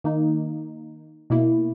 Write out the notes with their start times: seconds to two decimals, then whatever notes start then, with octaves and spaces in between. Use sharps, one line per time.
0.04 D#3 A#3 D#4
1.30 B2 A#3 E4